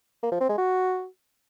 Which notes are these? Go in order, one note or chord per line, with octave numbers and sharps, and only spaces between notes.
A#3
F3
C4
G#3
F#4